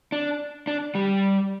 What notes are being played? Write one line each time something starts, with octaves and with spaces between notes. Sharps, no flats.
D4
D4
G3